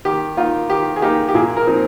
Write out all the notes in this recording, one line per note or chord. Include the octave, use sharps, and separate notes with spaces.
D#3 G4
A#3 D#4 F4
D#3 G4
G#4
A#3 D#4 G4
G4
A#2 G#4
A#4
F3 C4 D#4